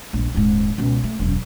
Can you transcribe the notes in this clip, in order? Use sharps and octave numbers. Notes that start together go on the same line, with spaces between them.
A#1 G2
D#1 G#2
C#2 B2
A3
E1 F#2